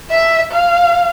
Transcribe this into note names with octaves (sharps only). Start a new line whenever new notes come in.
E5
F5